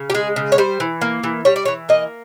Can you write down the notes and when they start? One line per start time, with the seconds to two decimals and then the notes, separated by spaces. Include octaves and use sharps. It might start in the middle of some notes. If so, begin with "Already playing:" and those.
Already playing: C#3
0.10 G4
0.15 G#3 G#4
0.36 C#3
0.52 C#5
0.58 G3 C5
0.80 E3
1.02 A#3
1.24 E3
1.45 G3 C#5
1.56 D5
1.66 E3 C#5
1.89 A#3 D#5